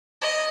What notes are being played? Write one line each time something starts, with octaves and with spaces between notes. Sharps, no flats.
D#5